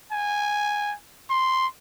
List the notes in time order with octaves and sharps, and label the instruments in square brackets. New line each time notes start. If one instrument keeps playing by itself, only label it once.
[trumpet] G#5
C6